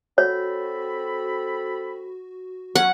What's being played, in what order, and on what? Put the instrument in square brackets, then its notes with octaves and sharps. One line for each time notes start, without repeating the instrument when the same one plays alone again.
[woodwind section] C4 A4 B5 [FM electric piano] F#4 [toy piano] C#5
[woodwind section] F#3 C#4 [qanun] F#5